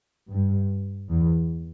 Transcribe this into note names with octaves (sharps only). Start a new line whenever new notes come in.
G2
E2